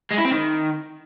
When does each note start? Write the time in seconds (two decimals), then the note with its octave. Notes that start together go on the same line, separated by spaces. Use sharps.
0.11 G#3
0.18 E4
0.25 C4
0.32 D#3